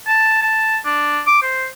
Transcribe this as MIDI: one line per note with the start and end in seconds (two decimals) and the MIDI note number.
0.07 0.39 81
0.42 0.77 81
0.85 1.21 62
1.27 1.40 86
1.43 1.66 72